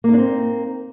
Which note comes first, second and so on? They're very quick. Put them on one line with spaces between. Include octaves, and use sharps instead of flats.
A#3 D#4 D4 C4